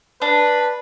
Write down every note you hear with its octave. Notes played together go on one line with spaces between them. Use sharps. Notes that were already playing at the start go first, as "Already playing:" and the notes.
D4 B4